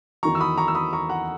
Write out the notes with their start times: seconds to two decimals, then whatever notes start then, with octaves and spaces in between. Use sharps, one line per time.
0.23 E2 D#3 F#3 A#5 C#6
0.35 E6
0.40 B5 D#6
0.58 A#5 C#6
0.68 E6
0.75 B5 D#6
0.93 A#5 C#6
1.09 F#5 A#5